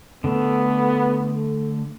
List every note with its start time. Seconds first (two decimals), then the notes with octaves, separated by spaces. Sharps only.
0.24 D3 A3 B3